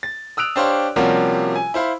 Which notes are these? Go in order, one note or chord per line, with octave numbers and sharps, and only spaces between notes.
A6
D#6 E6 F#6 D7 F7
D4 G4 C5 C#5 F5 C6
C3 F3 G3 A#3 C#4 F#4
G#5
E4 C5 F5 B5